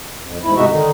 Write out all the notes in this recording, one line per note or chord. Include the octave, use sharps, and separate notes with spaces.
F2
E2 G#2 E4
G#2 C3 G#3 D#4 F#4 E5
D3 D#3 D#4